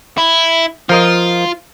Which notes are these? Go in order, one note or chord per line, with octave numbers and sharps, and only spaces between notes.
E4
F3 F4 A#4 D#5